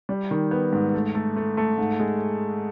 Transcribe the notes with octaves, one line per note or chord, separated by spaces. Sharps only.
G3
D#3
B3
G#2
A3
A3
A3
A3
G#2
G#3